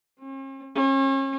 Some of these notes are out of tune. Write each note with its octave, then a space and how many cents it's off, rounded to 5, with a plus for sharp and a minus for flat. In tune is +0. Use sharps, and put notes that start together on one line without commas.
C#4 -45
C#4 -40